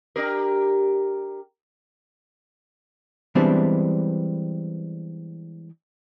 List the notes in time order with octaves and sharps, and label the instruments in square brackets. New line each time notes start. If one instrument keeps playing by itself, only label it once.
[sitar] D4 G4 A#4
[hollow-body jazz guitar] E3 G3 G#3 B3 C4 D4